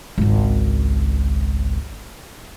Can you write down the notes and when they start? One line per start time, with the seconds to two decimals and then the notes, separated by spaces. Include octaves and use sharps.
0.18 G#1 C#2